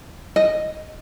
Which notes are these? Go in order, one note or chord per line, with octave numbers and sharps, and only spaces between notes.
D#5